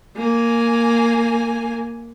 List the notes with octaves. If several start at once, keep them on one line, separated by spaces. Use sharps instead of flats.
A#3 G#5